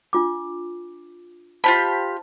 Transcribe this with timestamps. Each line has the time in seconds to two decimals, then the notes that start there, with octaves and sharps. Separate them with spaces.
0.13 D4 F4 D6
1.64 F4 G4 C5 D#5 A5 B5